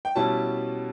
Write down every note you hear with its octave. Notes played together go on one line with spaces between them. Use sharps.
G5
B2 G3 C#4 E4 A5